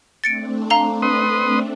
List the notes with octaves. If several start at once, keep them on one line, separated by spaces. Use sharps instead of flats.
A3 C4 D4 A6 C#7 D7
F5 A#5 G7
B4 C6 D#6